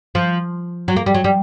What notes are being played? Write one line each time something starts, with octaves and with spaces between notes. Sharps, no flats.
F3
F#3
A#3
G3
F#3
G3